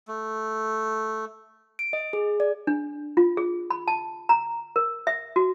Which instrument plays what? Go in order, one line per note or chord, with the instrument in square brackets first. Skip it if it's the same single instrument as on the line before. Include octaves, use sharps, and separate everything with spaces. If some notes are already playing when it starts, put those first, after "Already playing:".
[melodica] A3
[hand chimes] D7
D#5
G#4
D5
[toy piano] D4
F4
G#4
B5
A5
A#5
A#4
E5
F#4